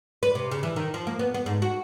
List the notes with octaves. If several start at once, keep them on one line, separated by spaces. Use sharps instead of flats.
B4
C3
C#3
E3
D#3
F3
A#3
B3
B3
G#2
F#4